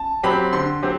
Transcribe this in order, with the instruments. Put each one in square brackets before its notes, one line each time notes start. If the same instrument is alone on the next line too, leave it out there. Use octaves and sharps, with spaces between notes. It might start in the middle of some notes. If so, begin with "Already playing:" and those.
Already playing: [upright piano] A5
[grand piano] F#3 C4 G4 [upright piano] B5
[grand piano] D3 [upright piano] C6
[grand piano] F#3 C4 G4